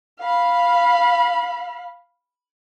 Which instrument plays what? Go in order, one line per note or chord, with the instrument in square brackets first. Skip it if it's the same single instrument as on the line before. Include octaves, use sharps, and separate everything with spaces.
[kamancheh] F5 B5